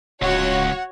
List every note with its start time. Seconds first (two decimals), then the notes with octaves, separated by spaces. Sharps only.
0.22 D1 C#2 F#4 C#5 F#5